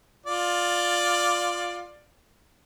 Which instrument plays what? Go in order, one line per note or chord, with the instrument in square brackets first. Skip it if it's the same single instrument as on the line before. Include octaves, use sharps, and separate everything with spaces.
[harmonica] F4 D5